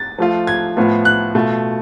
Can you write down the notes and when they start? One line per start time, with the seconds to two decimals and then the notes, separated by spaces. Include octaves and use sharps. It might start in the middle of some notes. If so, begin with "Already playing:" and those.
Already playing: A6
0.18 F3 A3 F4
0.47 G#6
0.77 A2 F3 B3 F4
1.05 F#6
1.35 B2 A3 F4